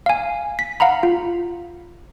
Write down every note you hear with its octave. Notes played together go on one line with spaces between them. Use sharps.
F5 G#5
B6
F5 F#5 A#5 B5
F4